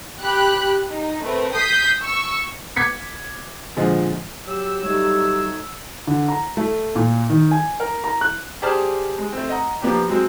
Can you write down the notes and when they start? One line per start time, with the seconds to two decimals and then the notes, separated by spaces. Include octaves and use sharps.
0.22 G4 B5 F#6
0.88 D#4
1.21 A3 C4 A#4 B4
1.53 D#6 G6 B6 C7
2.02 C#6 E6
2.76 D6 G#6 B6 C#7
3.77 A#2 D3 F3 G#3
4.46 F#3 G4 E6
4.83 G3 A3 D#4 C#5
6.07 D3
6.28 A#5
6.57 A3
6.95 A#2
7.29 D#3
7.51 G#5
7.80 A#4
8.04 A#5
8.21 F#6
8.62 G4 G#4 C5 D5 A5 F6
9.18 G#3
9.32 A3 C4
9.49 D#5 F#5 A#5
9.82 F3 A#3 B3 D4 G4
10.08 F#3 G#3 C4